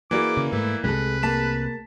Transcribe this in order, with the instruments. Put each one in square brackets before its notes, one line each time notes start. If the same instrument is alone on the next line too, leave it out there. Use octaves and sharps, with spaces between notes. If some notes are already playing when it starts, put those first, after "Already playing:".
[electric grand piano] E3 A#3 D5 [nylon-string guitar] E4 F#4 G#4 [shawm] D6
[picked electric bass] C#3
[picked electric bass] G#2 A3 [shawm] E4 [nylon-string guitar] B4
[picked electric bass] C2 C3 [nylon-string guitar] G#3 A4 [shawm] B4
[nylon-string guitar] A#3 G#4 [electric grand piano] A5 B6 E7